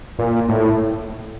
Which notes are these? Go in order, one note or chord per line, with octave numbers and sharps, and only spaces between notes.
A#2
A2